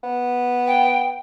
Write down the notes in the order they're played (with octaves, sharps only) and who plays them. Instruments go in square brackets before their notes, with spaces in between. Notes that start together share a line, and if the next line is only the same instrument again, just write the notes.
[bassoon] B3
[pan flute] G5